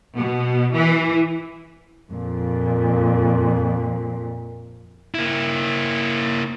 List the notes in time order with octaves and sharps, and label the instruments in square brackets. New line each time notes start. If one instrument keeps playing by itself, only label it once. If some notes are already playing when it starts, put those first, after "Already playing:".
[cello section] B2
E3
[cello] F2 A#2
[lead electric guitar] A#3 E4